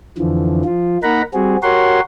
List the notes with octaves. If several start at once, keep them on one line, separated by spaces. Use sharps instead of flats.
F2 D3 E3 F3
F3 F4
A#3 D#4 A#4 F#5 A#5 B5
G3 C4 F#4 G#4
F#4 G4 A#4 C#5 F#5 C6